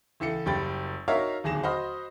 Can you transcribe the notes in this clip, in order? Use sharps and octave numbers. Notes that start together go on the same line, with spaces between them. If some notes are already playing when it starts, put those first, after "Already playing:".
C#2 E3 A4 C#7
F#1 G3 G5 B5 A6
D#4 F#4 A#4 C#5 E5 F5
D1 D#2 G#4 A#6 E7
F#4 C5 D#5 B5 C6 F6